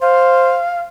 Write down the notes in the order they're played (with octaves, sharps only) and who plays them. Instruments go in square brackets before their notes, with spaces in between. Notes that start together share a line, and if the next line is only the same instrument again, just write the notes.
[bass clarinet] C5 [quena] F5